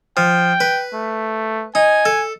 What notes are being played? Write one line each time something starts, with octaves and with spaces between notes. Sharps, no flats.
F3 G5
B4
A3
D#4 G#5
A4